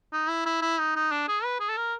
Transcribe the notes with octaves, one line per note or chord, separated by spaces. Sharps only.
D#4
E4
E4
E4
D#4
D#4
D4
G#4
B4
G#4
A4
A#4